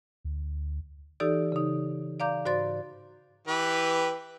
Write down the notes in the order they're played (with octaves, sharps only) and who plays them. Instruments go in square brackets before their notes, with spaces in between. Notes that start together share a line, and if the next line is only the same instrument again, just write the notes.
[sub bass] D2
[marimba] E3 D#4 G4 A4 D5 E6
C#3 D#4
D5 F5 A#5 D6 G6
G#2 F#4 C5 D5 C6 A6
[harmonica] E3 G4 B4